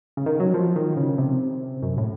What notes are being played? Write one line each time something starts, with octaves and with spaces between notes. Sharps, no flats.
C#3
D#3
F#3
F3
D#3
C#3
C3
F#2
A2